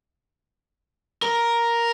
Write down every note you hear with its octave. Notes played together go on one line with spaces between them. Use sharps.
A#4